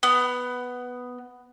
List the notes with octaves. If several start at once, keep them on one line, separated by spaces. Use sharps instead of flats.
B3